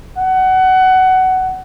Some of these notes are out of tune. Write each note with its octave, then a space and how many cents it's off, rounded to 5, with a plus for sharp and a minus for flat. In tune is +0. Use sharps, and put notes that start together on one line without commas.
F#5 +20